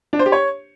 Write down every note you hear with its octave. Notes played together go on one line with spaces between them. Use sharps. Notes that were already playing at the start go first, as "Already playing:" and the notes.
D4
C5
G4
C#5